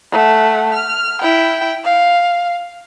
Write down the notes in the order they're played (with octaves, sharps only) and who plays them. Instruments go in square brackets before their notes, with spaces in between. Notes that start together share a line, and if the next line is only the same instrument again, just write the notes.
[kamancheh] A3 F#5
F6
E4 G5
F5